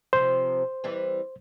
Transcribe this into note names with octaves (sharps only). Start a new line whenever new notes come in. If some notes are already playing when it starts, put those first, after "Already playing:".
C3 F3 C5
E3 G3 C4